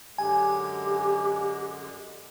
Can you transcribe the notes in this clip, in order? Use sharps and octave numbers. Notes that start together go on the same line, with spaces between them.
F#2 D3 G#3 G4 G#5